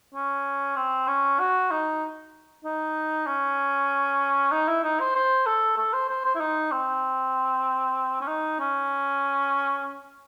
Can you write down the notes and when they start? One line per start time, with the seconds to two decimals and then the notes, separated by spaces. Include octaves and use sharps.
0.15 C#4
0.76 C4
1.08 C#4
1.40 F#4
1.71 D#4
2.65 D#4
3.27 C#4
4.52 D#4
4.68 E4
4.84 D#4
5.00 C5
5.15 C5
5.46 A4
5.78 A4
5.93 C5
6.10 C5
6.25 C5
6.35 E4
6.41 D#4
6.72 C4
8.21 C#4
8.28 D#4
8.59 C#4